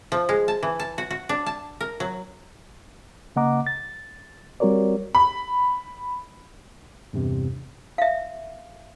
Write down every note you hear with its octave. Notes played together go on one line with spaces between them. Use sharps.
F3
G#3
A5
E3
A5
F#4
F#4
D4
A5
A#4
F#3
C#3 A#3 D#5 F#5 A#5 D6
A6
G3 C4 F#4 A#4 C#5 D5
B5
E2 G2 C3
E5 F5